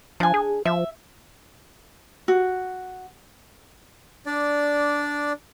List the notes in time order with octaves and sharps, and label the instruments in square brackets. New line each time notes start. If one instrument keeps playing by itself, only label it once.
[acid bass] F3 [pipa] D4 G#5
[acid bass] G#4
[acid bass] F3 [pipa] E5
[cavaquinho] F#4
[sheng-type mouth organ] D4 D5